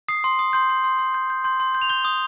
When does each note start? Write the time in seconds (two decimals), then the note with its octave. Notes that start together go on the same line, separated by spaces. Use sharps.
0.08 D#6 C7
0.24 C6
0.39 D#6
0.53 C6 G6
0.69 C6
0.84 C6
0.99 C6
1.14 G6
1.30 G6
1.44 C6 G6
1.60 C6
1.75 G6
1.82 F7
1.89 G6 G7
2.05 D#6